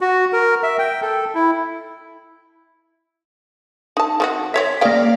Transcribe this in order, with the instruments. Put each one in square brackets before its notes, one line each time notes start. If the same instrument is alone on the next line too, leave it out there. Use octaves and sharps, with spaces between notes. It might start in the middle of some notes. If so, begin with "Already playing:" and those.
[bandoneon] F#4
A#4
E5
G5
A4
E4
[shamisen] D#4 A5
D#3 C4 F#4
[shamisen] C4 C#5 E5 [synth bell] B6
[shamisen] C#3 F3 G5 [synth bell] A#3 D5 F5